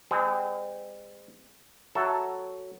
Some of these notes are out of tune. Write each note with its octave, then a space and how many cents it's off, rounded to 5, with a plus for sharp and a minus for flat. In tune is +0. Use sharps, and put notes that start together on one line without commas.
G#3 -45 C4 -35 G#4 +25
F#3 +5 A4 +0 E5 +0